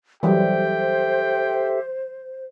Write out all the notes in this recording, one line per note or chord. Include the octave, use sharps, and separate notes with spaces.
E3 F#3 G3 G4 A4 C5 E5 G5